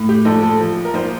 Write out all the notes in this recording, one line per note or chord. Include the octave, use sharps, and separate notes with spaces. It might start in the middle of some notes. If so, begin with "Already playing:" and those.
Already playing: A2
G4
A#1 A4
A4
F3
A#4
A#1 C5